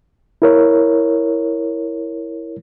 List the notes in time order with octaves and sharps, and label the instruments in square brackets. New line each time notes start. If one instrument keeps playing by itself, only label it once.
[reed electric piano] E4 A#4 C#5